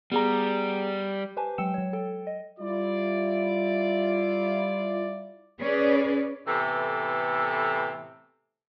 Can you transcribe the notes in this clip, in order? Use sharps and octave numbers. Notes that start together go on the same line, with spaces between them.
G3 B3 G#4 A#5
G4 B4 C5 G#5 A5
F#3 G#3 G5 E6 C#7 E7
F#3 C#5
A4 G5
D#5
G3 E4 F4 D5
C#4 G#4 B4 D5
A2 C3 E3 A3 B3 A4